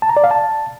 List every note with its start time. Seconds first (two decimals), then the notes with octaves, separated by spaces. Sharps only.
0.02 A5
0.09 A#5
0.17 D5
0.24 F5
0.31 A5